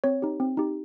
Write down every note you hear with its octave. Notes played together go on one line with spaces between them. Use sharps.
C4 C#5
D#4 G4
C4
D#4 G4